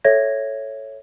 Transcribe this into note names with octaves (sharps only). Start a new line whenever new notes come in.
A4 C#5 E5 G#6 A#6